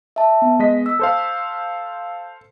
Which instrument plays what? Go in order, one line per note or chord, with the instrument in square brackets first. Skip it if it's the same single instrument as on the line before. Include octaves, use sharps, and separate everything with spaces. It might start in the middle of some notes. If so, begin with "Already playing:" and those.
[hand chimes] E5 A5
B3
[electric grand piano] G#3 D#5 B6
[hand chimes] E6
[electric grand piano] A4 C5 F5